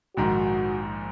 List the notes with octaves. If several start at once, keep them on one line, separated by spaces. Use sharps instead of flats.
A#1 G#2 D#3 F#4